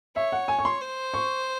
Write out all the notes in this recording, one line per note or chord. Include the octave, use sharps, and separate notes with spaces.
C#5 E5
F#5
G#5
C#6
C6
C5
C#6